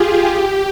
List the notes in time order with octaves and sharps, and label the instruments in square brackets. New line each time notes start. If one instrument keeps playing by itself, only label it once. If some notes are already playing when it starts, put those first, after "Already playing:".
Already playing: [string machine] F4 G4 G#4
G4